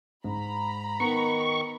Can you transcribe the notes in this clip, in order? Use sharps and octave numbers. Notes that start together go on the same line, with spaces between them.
G#2 A#5 B5
D#3 B3 C#6